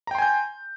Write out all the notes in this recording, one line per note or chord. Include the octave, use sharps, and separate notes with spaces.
G5 G#5 A#5 C6 G6